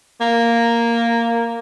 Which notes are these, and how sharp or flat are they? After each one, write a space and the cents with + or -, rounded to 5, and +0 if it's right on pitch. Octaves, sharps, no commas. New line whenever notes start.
A#3 -5